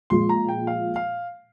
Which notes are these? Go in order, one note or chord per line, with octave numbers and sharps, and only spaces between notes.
A#2 F3 G#3 C6
A#5
G5
F5
F5